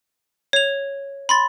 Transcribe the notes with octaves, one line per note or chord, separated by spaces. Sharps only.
C#5 F7
B5 C6 A6